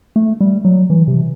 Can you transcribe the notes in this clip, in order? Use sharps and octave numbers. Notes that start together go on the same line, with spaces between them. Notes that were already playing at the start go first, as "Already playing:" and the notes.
A3
G3
F#3
E3
C3